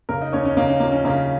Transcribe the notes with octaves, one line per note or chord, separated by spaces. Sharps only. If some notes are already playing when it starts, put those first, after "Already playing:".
C#3 A#3 A#4
D#4 D#5
D#2 C#4 C#5
C#4
C#3 A#3
C#4
F3 A#3
C#4
C#3 A#3